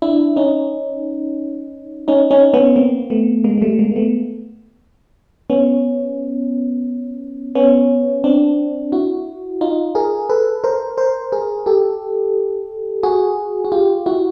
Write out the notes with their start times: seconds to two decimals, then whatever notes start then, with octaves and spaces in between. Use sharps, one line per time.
0.02 D4 E4
0.36 C#4 D#4
2.08 C#4 D#4
2.31 C#4 D#4
2.54 B3 C#4
2.76 A#3 C4
3.10 A3 B3
3.44 G#3 A#3
3.58 A#3
3.62 G3 A3
3.79 G#3 A#3
3.92 A#3
3.96 A3 B3
5.50 B3 C#4
7.55 B3 C#4
8.24 C4 D4
8.92 E4 F#4
9.61 D#4 F4
9.95 G#4 A#4
10.29 A4 B4
10.64 A#4 C5
10.97 A#4 C5
11.32 G#4 A#4
11.66 G4 A4
13.03 F#4 G#4
13.65 F#4
13.72 F4 G4
14.06 E4 F#4